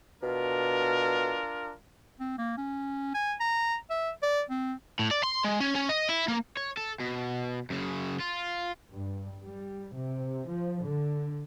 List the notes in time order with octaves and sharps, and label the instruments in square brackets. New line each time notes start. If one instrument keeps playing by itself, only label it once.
[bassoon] B2 [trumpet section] D4 F4 A#4
[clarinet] C4
A#3
C#4
G#5
A#5
E5
D5
C4
[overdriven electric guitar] A2
D5
C6
G#3
C#4
C#4
D#5
E4
A#3
C#5
A4
B2
F#2 C#3
F4
[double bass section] G2
G3
C3
F3
D3